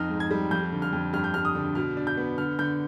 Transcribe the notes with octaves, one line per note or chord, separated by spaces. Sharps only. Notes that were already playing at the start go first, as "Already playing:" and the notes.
Already playing: F2 D#4 F6
G#2
G#6
G3
F2 G6
D3
F6
F2
G2 F6
G6
G2 F6
D#6
D3
B2 F6
D4
G6
B3
D3 F6
D3 G6